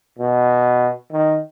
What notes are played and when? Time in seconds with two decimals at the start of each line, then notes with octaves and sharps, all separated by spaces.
0.19 B2
1.12 D#3